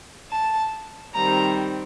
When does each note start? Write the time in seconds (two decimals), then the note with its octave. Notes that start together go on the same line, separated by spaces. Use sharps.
0.31 A5
1.14 D#3 G3 C4 A#5